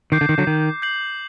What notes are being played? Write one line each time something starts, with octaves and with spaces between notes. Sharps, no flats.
D#3 D6 G6 C7
D3
D#3
D3 F#3
D#3
G6 C7 F#7